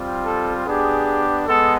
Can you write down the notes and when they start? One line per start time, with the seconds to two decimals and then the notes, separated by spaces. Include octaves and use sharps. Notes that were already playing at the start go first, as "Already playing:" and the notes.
Already playing: G3 C4 F4
0.25 A4
0.66 B3 D4 G4 G#4
1.47 G#3 B3 A4